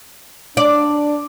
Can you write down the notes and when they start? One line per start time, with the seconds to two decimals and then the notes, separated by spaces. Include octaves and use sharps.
0.57 D4 D5